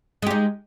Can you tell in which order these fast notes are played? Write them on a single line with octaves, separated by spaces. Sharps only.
G#3 G4 D#4